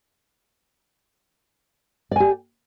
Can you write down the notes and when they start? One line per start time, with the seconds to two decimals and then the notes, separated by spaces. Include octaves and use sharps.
2.11 D5
2.16 G#5
2.20 G4